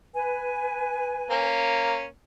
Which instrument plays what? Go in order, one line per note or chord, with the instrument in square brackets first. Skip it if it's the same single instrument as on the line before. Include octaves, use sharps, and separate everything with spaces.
[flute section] B4 G#5
[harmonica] A#3 C#4